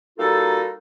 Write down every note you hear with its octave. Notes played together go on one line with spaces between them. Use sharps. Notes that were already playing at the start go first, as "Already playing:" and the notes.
G3 A#3 D#4 F4 F#4 A4